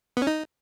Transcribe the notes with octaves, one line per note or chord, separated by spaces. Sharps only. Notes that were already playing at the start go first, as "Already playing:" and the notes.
B3
C#4
D#4